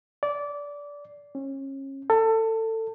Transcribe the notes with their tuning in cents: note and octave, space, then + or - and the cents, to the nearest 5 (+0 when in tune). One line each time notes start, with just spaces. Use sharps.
D5 -20
C#4 -30
A4 +25